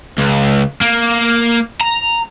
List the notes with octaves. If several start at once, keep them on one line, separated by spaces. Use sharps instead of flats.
C#2
A#3
A#5